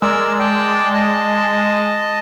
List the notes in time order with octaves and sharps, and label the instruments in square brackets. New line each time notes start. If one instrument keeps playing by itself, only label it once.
[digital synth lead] G#3 [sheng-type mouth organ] A#4 D5 E6
[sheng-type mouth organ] D5 G5 A5
D#5 A5